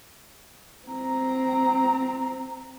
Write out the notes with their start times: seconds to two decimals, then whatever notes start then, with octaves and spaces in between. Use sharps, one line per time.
0.88 C4 A#5